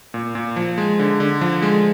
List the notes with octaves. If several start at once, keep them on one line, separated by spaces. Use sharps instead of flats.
A#2
A#2
F3
G#3
D3
D3
F3
G#3